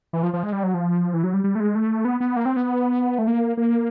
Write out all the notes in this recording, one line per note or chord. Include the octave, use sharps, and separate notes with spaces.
E3
F3
F3
G#3
G3
F#3
F3
E3
F#3
G3
G3
A3
G#3
A3
B3
B3
A#3
C4
B3
A3
A#3
A#3